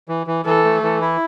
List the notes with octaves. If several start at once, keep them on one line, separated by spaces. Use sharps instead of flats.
E3
E3
E3 A4
A3
E3
E4